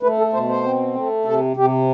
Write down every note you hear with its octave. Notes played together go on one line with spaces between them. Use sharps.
A3 B4
A4
B2 C5
C5
C4
A3
C3 A4
C3 G4